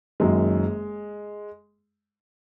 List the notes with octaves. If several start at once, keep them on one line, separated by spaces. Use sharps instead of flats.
F#1 F#2 D#3 F#3 G#3